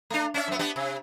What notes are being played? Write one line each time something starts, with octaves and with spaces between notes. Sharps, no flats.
A3 D4
C#4 D4 E5
F#2 B3
B3 D4 G4
C3